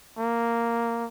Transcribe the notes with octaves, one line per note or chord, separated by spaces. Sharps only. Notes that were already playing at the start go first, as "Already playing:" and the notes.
A#3